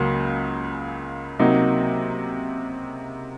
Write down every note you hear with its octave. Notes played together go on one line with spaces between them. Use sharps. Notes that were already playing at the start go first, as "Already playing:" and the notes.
Already playing: C#2 C#3 F#3 A#3
C3 F#3 A#3 D#4